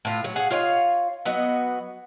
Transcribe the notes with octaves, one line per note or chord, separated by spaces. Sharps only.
A2 F4
F#3
G#4 F5 F#5
F4 C#5 D#5 F5
F#3 B3 F#4 D#5